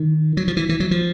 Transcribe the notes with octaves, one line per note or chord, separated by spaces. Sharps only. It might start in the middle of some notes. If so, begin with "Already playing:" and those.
Already playing: D#3
F#3
F3
E3
E3
F#3
F3